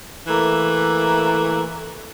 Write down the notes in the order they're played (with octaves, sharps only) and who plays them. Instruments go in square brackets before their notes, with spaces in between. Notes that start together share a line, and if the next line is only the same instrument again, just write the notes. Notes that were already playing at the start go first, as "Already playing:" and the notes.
[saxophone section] E3 A3 A#3